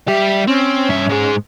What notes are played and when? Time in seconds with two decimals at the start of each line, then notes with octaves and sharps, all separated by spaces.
0.08 G3 G4 E5
0.48 C4 C#4
0.89 G2 E5
1.09 G#2 G#3